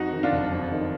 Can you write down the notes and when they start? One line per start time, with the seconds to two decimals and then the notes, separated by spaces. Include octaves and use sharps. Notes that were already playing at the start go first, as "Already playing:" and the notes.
Already playing: F2 D#4 F#4
0.13 D#3
0.23 D4 F4
0.32 F#1
0.51 F2
0.71 D#3